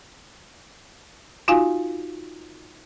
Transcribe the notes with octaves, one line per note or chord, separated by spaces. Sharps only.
D#4 F4 F#4 F5 G#5